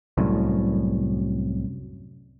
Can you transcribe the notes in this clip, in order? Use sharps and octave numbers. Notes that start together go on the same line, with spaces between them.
C2 F#2 A2